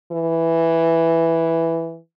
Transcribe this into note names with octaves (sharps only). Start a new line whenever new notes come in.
E3